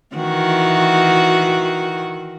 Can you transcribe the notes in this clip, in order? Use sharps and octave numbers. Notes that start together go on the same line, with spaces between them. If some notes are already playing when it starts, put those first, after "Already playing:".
D#3 E3 F#4